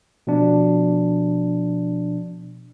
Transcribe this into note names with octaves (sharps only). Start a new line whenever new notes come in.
B2 F3 D4